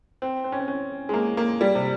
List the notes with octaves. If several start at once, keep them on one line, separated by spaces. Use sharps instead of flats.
C4
C4
C#4
C4
C#4
G#3
A#3
A#3
G3
C3